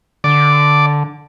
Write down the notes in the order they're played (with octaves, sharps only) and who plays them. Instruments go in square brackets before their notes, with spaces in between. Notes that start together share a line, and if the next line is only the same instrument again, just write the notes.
[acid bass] D3 [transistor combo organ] D5